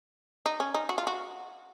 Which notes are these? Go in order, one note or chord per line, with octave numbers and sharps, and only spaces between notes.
D#4
C#4
D#4
F#4
F4
F#4